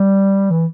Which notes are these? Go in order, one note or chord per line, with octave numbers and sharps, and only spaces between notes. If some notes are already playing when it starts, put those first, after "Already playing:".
Already playing: G3
E3